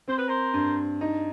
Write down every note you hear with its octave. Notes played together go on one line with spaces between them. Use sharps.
C4 C5
B4
A#4 C5
G2
D#4